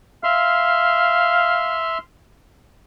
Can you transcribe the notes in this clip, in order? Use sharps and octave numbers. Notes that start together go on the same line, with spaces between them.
E5 F5 C6 F6